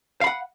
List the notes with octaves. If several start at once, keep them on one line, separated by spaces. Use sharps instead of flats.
F5 F#5 B5